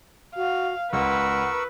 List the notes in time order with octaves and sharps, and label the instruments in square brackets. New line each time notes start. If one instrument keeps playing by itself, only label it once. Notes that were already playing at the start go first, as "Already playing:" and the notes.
[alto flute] F#4 [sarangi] F5
[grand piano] C#2 [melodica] A#4 C#6 E6 [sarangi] B4 [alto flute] F#5